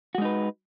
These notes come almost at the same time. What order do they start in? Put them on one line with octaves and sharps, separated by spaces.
F#4 G#3 D#4 B4